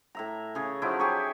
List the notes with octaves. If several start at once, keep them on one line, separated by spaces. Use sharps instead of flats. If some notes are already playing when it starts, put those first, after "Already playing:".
A2 E5 A#5
C#3 G#4
F3 F#3 D#4 E4
G4 G#4 G#5 C#6